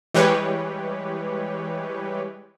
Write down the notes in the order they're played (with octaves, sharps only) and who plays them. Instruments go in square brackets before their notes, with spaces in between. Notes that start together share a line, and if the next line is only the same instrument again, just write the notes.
[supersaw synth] E3 G3 G#3 G4 B4 C#5